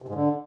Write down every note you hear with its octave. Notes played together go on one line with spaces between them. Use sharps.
C3
G#2
D3